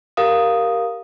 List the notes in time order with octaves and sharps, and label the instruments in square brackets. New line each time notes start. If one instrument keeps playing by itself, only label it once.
[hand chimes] G4 A#4 F5 D#6